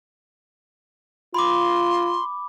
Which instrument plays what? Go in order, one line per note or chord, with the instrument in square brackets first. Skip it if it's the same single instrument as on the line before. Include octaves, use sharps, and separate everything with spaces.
[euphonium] F4 [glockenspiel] B5 D6 [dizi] C6